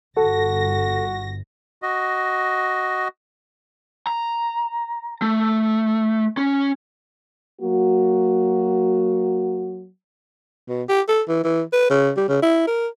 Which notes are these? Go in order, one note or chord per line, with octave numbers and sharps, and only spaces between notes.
G1 F#4 A4 A#6
F#4 D#5
A#5
A3
C#4
F#3 A#3 F#4
B2
G4
A4
E3
E3
B4
C#3
G3
C#3
E4
A#4